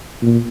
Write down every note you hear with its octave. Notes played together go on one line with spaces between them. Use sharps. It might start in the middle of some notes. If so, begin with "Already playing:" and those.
A#2